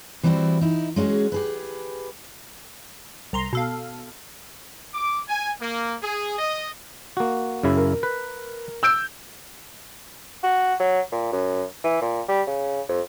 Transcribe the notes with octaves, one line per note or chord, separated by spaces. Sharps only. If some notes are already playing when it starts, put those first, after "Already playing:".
E3 G3 C4 D#4 E4 F#4
D#4 E4
G#3 C#4 F4 F#4 G#4
G4 G#4 B4
C2 A#5 C6
B2 A4 F5
D6
G#5
A#3
G#4
D#5
A#3 F#4
F#2 C#3 E4
A#4
B4
E6 G6 D7
F#4
F#3
A#2
F#2
E3
A#2
G3
C#3
F2